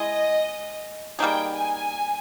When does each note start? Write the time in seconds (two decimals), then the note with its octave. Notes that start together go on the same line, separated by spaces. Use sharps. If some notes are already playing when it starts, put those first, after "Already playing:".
Already playing: G#3 E4 G#4 D#5
1.19 G3 A#3 D#4 G#4 G5
1.55 G#5